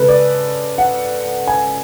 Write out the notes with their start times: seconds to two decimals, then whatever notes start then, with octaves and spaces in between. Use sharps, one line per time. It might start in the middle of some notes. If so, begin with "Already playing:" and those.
Already playing: C#3 G#3 A4 B4
0.09 D5
0.78 F#5
1.47 G#5